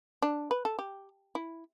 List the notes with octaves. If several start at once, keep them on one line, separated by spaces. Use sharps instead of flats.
D4
B4
A4
G4
E4